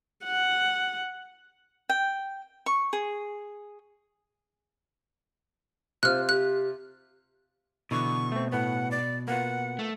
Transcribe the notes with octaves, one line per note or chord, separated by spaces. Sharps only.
F#5
G5
C#6
G#4
C3 F4 C5 F6 F#6
G4 F#6
B2 D3 E3 C#6
A3 C4
A2 B3 F#5
D5
A#3 B3 F4 F#5
A3